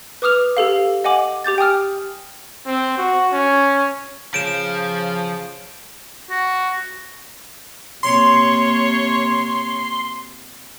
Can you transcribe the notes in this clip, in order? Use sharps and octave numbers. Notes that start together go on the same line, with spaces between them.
B4 D6 D#6 F6 F7
G4 A4 F5
D#5 F#5 G#5 D6 F#7
G4 D6 G6 A6
G5 G#5 D#6 F6
C4
F#4
C#4
C#3 F3 D7 E7
F#4
C3 A#3 C#5 C6